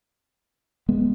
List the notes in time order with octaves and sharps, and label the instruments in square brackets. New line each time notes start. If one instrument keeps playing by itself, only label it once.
[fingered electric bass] G#3 B3